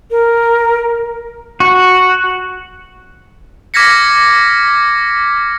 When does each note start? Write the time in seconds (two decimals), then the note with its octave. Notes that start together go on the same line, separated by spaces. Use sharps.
0.11 A#4
1.60 F#4
3.74 D6 F6 G#6 A#6 B6 C#7